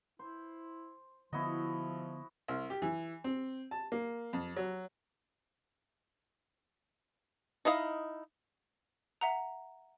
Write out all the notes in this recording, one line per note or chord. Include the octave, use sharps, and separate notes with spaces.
E4 C5
D3 F3 B3 E4 F#4 D#5
C2
G4
E3
C4
A5
A#3
F2
F#3
D#4 E4 D#5 F5
E5 F#5 A#5